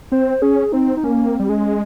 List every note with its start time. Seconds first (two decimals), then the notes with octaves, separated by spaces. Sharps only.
0.12 C4 C5
0.42 C#4 G#4
0.72 C4 D#4
0.97 D#4
1.03 A#3 C#4
1.26 C4
1.39 G3
1.49 G#3 C#4